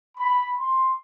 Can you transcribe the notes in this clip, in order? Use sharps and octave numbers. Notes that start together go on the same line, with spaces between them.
B5
C6